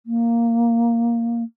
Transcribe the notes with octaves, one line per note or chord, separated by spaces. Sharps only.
A#3